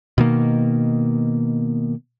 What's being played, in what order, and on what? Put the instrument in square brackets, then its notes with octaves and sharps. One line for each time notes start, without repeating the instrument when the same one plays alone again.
[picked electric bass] B2 D#3 A#3